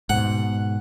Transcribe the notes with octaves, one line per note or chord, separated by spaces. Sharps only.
G#2 B2 F#5